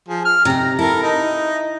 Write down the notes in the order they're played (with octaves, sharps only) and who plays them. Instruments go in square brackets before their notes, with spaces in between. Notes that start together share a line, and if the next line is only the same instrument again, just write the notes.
[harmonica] F3 G#4
F6
[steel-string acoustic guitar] C3 D#4 [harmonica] A#5
[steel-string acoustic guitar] E4 [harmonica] A4 A#4
[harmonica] D#4